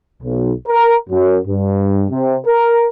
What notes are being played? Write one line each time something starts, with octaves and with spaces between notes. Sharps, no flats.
B1
A#4
F#2
G2
C3
A#4